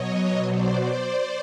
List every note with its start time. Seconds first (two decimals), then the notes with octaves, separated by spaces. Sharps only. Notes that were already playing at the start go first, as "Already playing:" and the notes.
Already playing: B2 F#3 C#5 D#5
0.46 C5 D5
0.80 C5 D5